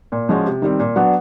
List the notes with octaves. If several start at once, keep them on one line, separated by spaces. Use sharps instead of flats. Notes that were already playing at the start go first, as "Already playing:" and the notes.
A#2
F3 G#3 C#4 F#4
C3
D#3 G3 C4
A#2
F#3 B3 D4 F#4